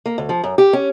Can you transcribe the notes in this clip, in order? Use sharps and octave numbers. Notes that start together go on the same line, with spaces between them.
A#3
D2
F3
F#2
G4
C#4